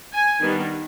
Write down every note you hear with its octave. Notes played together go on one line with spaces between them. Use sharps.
G#5
D#3 G3 B3 D4